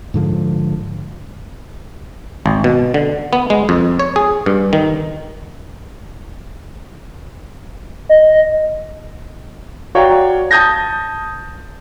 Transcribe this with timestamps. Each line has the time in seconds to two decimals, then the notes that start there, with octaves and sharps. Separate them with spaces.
0.14 G#2 D3 F3
2.46 G#1
2.64 B2
2.94 D3
3.33 B3
3.50 G#3
3.69 F2
3.99 C#5
4.16 G#4
4.46 G2
4.73 D#3
8.09 D#5
9.95 F#4 C#5 D5 F5 G5 A#5
10.51 A5 D#6 G6 G#6 A#6